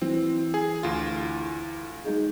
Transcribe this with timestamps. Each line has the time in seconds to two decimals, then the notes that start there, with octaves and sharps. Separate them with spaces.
0.02 E3 C4
0.54 G#4
0.83 D2 F4
2.04 G#3 D#4 G#4